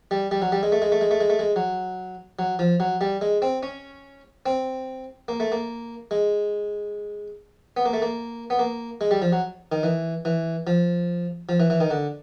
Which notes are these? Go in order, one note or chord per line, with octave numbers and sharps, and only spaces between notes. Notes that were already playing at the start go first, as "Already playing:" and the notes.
G3
G3
F#3
G3
G#3
A3
G#3
A3
G#3
A3
G#3
A3
G#3
F#3
F#3
F3
F#3
G3
G#3
C4
C#4
C4
A#3
A3
A#3
G#3
B3
A#3
A3
A#3
B3
A#3
G#3
G3
F3
F#3
D#3
E3
E3
F3
F3
E3
E3
D#3
D3